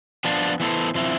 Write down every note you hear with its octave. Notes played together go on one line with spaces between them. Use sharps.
F3 B3 D4 F4
E3 B3 E4 A4 C5
F3 C4 E4